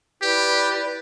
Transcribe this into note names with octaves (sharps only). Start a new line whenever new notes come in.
E4 G4 B4 D5